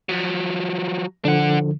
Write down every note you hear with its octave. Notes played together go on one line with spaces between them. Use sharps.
F3 F#3
D3 F3 D4 F#5